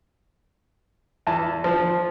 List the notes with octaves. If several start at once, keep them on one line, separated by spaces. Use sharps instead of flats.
E2 A5
F3